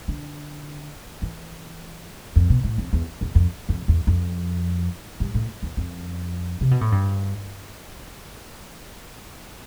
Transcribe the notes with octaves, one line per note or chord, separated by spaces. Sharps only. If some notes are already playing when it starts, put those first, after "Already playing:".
D3
E3
F2
B2
A2
F2
E2
E2
F2
F2
E2
F2
G2
A2
E2
F2
C3
B2
A2
G2